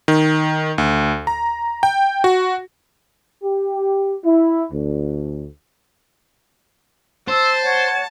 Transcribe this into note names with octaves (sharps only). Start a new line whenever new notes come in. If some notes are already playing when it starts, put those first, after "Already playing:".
D#3
D2
A#5
G5
F#4
G4
E4
D2
C5 A5 E6
C#5 F#5